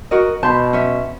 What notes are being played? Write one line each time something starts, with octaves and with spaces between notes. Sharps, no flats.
F#4 A#4 D#5
B2 A5 B5 C6 G6
C#4 E5